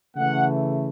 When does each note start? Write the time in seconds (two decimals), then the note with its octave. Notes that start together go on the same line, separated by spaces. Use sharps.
0.16 C#3 E3 A3 F#5